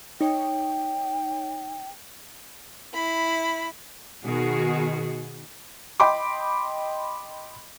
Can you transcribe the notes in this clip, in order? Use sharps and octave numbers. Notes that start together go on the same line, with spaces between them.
D#4 C#5 G5
E4 B5
B2 D#3 F#4 G#4
D#5 G5 B5 C6 D6